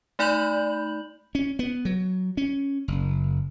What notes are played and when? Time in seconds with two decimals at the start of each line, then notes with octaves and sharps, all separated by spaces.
0.19 A3 D#4 D5 B5 G6 F#7
1.35 C#4
1.59 B3
1.85 F#3
2.37 C#4
2.88 F#1